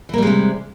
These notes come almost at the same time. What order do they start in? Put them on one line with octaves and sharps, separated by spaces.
E3 A#3 G3 G#3 C3